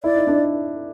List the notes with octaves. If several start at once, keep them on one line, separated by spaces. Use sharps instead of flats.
E4 D5
D#4
D4